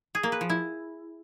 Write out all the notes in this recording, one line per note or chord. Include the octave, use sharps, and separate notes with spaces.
G#4
A#3
B4
F3
E4